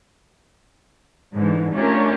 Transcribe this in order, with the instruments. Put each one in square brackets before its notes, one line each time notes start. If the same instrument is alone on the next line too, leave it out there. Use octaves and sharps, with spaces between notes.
[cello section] G#2 D3 E3
A3 C#4 D4 F4 G4 A#4